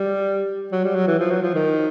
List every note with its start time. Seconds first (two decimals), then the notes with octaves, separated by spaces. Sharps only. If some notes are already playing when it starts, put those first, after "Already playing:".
Already playing: G3
0.72 F#3
0.84 G3
0.95 F#3
1.07 E3
1.20 F3
1.31 F#3
1.43 F3
1.54 D#3